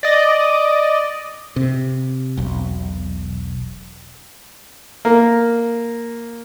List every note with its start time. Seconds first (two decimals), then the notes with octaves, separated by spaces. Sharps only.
0.03 D5 D#5
1.56 C3
2.37 E1 B1
5.05 A#3